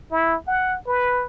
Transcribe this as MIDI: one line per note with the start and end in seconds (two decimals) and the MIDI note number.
0.11 0.36 64
0.47 0.77 78
0.87 1.26 71